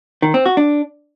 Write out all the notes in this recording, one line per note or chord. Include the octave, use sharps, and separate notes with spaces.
D#3
C4
F#4
D4